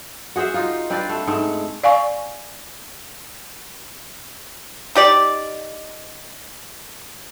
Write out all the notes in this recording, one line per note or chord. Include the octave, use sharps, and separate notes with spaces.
F#4 G#4 C5 E5
D#4 F4
C4 D4 B4 D5
A3
G#2 G#3 A3
D5 F5 G#5 C#6
D#4 G4 D5